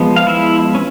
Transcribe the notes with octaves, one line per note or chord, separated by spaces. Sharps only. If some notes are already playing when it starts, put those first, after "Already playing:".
Already playing: F3 G#3 B3
F5
E4 E5
C#4